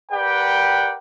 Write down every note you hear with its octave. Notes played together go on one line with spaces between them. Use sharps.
G4 A#4 B4 D5 F#5 G5